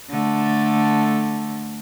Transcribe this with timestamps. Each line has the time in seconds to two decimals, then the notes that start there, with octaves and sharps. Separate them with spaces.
0.10 D3 A3